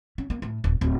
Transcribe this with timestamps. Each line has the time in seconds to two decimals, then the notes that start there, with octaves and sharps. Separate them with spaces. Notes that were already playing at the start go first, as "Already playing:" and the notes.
0.18 C#4
0.30 A#3
0.42 A2
0.64 D#1
0.81 D1